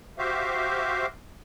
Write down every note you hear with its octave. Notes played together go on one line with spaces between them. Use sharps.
F#4 G4 C5 E5 F5